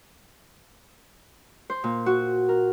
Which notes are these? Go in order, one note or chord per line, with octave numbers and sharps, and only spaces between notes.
C5
A#2
F#4
A#4